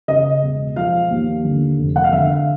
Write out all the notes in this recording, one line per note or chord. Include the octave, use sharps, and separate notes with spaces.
C#3 D#5
E1
F3 F5
D#2
D3
F1
F#5
F5
D3 E5
F5